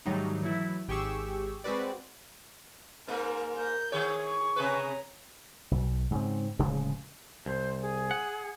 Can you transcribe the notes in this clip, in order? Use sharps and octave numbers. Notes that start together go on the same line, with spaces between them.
G#2 D#3 F#3 G3 A3 D#4
E3 F#3 A3 E4
G#1 G4 G#4 C#6 E6
G#3 C4 F#4 B4 D5
G#2 A#3 A#4
A#4 G6
D#3 G#4 C#5
C#6
C3 G#4 B4 C#5 A#5
B1
G#2 C#3 C4
D1 C#3 F3 G#3
C2 C5
G#4
F#5